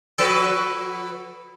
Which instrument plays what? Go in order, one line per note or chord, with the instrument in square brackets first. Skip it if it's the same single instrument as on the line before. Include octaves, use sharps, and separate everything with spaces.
[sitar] F3 F#4 B4 [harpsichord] A4 G5 A5